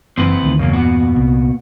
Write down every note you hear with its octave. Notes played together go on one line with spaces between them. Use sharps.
F#1 E3 C4 E4 B4
D2 D3 D#3
G1 E2 C#3 F#3 A#3
A#2 B3 F#4
C2